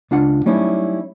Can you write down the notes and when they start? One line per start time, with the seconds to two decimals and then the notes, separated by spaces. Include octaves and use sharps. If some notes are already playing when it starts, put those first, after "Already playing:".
0.11 C#2 D4 F4 F#5
0.46 F#3 G3 A3 C#4 D#4 E4